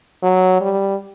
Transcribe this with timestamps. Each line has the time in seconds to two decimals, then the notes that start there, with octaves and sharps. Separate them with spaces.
0.23 F#3
0.61 G3